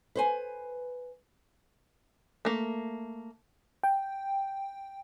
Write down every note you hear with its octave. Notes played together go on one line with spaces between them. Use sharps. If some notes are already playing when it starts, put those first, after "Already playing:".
B4 C5 G#5
A3 A#3
G5